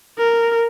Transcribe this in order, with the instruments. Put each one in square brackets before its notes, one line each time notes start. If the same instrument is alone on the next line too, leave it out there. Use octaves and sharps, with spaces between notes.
[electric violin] A#4